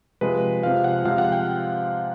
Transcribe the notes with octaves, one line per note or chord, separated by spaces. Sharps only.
C3 F3 G#3 B4
C3 F3 G#3 F5
F#5
C3 F3 G#3 F5
F#5
G5